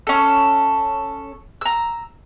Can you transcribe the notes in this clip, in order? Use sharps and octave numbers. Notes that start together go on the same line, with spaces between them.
C#4 A4
A#5 E6